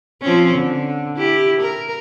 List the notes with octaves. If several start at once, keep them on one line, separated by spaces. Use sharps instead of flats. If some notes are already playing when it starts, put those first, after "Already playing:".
F3 C4 C#4
D3
E4 G4
A#4